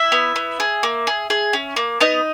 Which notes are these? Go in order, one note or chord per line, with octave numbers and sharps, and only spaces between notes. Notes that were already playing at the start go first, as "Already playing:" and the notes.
Already playing: E4 E5
B3
B3
G#4
A#3
G#4
G#4
C#4
A#3
B3 D#4 D#5